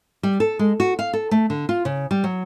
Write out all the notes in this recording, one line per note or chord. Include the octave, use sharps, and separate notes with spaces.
G3
A4
G#3
F#4
F5
A4
A3
D3
F4
C#3
G3
F#3